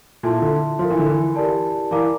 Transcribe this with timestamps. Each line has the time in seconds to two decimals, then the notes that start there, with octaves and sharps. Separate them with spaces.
0.23 A#2 E4 A4 E5 A5 C6
0.42 D3
0.79 F3 A#4 F5 C6
0.90 E3
0.99 D3
1.09 E3
1.36 E4 G4 A#4 D5 A5
1.91 E3 A#4 D5 F5 A#5 D6